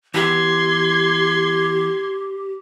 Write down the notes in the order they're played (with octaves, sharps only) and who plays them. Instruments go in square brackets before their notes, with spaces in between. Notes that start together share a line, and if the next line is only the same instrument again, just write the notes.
[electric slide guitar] E3 B3 [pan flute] G4 [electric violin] C6 G#6